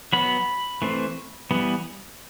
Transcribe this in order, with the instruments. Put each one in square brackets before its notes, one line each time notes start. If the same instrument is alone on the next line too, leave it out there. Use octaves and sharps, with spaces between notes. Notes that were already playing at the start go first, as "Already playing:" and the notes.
[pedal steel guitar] F#3 B3 B5
E3 A3 C4
E3 G3 B3